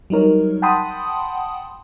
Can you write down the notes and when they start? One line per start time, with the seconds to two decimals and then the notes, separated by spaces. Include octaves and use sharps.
0.10 F#3 G3 D#4 A#4 C#5
0.62 F#5 G5 A5 B5 C6 D#6